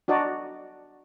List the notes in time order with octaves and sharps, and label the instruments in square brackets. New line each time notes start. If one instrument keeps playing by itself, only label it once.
[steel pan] D4 F#4 D5 D#5 A5 A#5